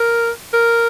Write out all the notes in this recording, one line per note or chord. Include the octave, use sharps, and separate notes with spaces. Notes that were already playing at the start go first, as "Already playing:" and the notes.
Already playing: A#4
A#4